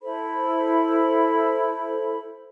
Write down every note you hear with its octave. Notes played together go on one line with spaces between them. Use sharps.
E4 A4 C5 B5